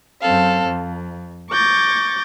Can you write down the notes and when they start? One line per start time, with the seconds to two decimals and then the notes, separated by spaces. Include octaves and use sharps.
0.21 F#2 C4 A4 F5
0.65 F2
1.50 C#6 D6 G6 A6 A#6